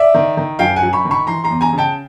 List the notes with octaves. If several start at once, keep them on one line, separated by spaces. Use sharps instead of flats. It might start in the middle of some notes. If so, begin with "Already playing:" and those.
Already playing: D5 E5
D#3
D#3
F#2 F5 G5
F#5 G#5
F#2
B5 C#6
D#3
B5 C#6
E3 A#5 C6
A#5 C6
E2
G#5 A#5
C#3
G5 A5